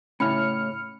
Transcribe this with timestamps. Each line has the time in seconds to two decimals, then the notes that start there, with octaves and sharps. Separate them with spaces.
0.20 A2 C#3 C#4 E4 B5 F6 C#7